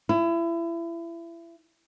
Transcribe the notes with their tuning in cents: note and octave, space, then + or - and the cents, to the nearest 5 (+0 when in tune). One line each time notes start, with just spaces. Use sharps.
E4 +30